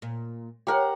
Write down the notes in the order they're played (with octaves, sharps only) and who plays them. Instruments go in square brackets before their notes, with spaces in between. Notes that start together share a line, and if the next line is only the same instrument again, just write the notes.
[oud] A#2
[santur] G4 A#4 F#5 [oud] C#5 F5